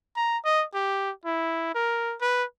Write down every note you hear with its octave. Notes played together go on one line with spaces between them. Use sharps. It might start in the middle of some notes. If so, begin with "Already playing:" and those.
A#5
D#5
G4
E4
A#4
B4